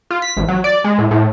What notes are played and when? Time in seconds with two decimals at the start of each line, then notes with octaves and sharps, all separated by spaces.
0.10 F4
0.22 B6
0.37 A1
0.48 F#3
0.64 D5
0.84 G#3
0.98 A2
1.11 A2